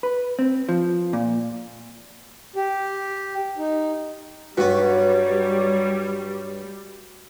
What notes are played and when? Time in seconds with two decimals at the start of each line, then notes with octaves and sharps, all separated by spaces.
0.03 B4
0.39 C4
0.69 F3
1.13 A#2
2.56 G4
3.58 D#4
4.57 G2 F#3 G3 B3 F#4 G4 C#5